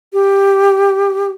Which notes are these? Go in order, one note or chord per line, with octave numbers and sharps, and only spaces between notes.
G4